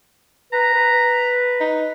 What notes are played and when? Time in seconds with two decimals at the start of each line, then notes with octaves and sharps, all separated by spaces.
0.53 B4 A#5
0.74 B4
1.60 D#4